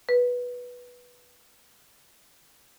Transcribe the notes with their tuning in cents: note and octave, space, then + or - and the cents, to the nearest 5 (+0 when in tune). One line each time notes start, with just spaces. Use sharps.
B4 -10